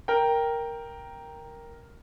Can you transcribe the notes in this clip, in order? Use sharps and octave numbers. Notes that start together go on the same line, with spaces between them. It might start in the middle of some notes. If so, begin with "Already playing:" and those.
A#4 G5